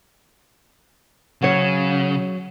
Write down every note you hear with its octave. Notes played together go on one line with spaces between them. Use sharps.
C#3 F#3 C#5